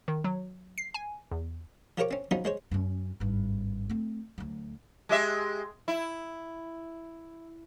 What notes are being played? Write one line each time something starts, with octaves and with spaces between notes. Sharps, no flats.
D#3
F#3
C7
G#5
E2
F3 G4 A#4 C#5 C#6 D6
C4 C#4
F3 F#3 B3 C#4 D#4
G#3 C5 C#5
F#2 C#4
G#1 G2
A3 C4
D2 F#3
G#3 G4 E5
E4